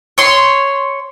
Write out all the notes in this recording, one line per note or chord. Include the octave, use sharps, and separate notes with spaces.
C#5 C6